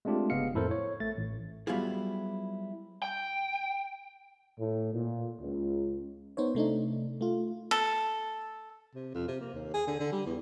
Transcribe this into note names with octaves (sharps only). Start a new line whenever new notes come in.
G#3 A3 C4 D4 F4 G4
G1 C#3 B3 D#5 F5 C#7
F2 A2 E4 A4 A#4 C5
C#5
A1 A3 A6
A1
F#3 G3 B3 E4 F4 G#4
G5
A2
A#2
C#2
B3 D#4 C5 C#5
C3 A3 D4 D#4
A3 F4
A4
C3
F2
C3
A#3
D#2
G#4
D3
D3
G3
E2